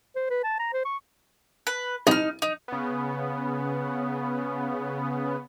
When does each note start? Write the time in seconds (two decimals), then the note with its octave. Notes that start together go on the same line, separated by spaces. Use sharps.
0.16 C5
0.30 B4
0.44 A5
0.59 A#5
0.74 C5
0.85 C#6
1.67 B4
2.07 C2 D#4 D#5 F6
2.42 D#4
2.68 C#3 B3